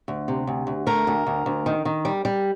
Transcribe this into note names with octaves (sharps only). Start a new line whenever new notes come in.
D2
C3
D2
D2
A3 A#4
D2
D2
D2
D#3
D#3
G3
G3